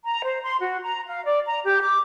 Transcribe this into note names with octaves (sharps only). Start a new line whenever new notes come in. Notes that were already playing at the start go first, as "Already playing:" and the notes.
A#5
C5
C6
F#4
A#5
F5
D5
A#5
G4
D6